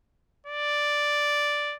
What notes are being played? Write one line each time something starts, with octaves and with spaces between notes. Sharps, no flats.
D5